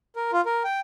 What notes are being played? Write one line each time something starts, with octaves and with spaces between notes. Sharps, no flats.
A#4
F4
A#4
G5